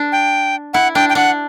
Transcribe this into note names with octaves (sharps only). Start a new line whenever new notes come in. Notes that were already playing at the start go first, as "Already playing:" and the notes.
Already playing: D4
G5
E4 F#5
D4 G5
G5
D4 F#5